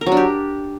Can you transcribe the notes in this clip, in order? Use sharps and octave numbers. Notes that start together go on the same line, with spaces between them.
A#4
F#3
D4
G4